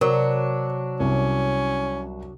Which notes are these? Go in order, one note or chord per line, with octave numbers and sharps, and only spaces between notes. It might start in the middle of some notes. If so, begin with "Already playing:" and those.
C3 F#3 D4 A#4
C2 C#4